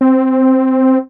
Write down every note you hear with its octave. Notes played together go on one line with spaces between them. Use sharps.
C4